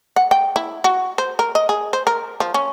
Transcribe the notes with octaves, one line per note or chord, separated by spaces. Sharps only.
F#5
G5
E4
F#4
C5
A#4
D#5
G#4
C5
A#4
F3
C#4